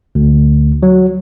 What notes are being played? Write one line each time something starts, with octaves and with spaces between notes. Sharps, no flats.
D2
F#3